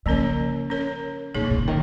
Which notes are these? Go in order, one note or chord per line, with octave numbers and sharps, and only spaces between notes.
C#3 F3 A#3 C#4 A#4 C#5
C#4 A#4 C#5
A#2 A#3 D#4 G#4 C#5
G#2
A#2
C#3
D#3